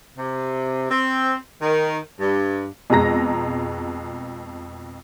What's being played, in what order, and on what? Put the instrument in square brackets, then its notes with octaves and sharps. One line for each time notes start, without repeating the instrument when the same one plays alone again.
[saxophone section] C3
C4
D#3
G2
[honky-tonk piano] F2 B2 G#3 A#5 A#6